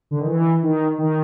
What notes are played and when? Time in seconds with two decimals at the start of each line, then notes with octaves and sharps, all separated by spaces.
0.11 D3
0.19 D#3
0.26 E3
0.63 D#3
0.98 D#3